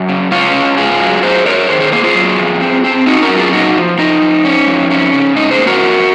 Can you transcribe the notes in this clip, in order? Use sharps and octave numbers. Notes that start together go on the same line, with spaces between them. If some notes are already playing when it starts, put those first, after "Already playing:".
Already playing: F#2
C#3
C#3 C#4 F4
C#3
G#2 F4 G#4
F#3
F#3 G#4 C5
F#3 A#4 C#5
D#3 G#4 C5
G#4 C5
A#3 G#4 C5
F4 G#4
F#3
F2
C4
C4
C#4 D#4 F#4
F#4 A#4
F#3
F4 G#4
A#2 D#4 F#4
F3
F3 D#4
F3
C#4
F2
C#4
C#3
G#2 D#4
G#4 C5
A#3
F#4 A#4
F2